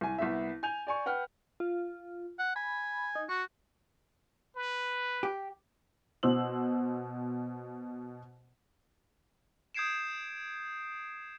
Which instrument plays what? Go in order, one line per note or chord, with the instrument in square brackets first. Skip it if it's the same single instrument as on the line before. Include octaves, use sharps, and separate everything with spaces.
[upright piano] C2 G#5
C2 B3 E5
G#5 G6 F7
D5 G#5 C#6
B4 F#5 G5 F6
[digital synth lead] F4
[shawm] F#5
[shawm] G#5 [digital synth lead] B5
[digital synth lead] D#4
[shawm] F#4 [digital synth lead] C#6
[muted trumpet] B4
[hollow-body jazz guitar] G4
[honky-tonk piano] B2 C5 E6 F#7
[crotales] D#6 G6 G#6 C7 D7 E7